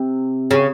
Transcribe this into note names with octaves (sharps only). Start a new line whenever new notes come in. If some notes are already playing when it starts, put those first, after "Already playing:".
Already playing: C3
C#3